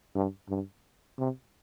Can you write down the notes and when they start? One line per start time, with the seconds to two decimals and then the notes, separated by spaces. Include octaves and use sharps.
0.15 G2
0.50 G2
1.19 C3